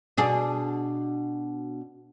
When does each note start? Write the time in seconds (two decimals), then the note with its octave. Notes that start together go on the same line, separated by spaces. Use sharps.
0.18 B2 D4 G#4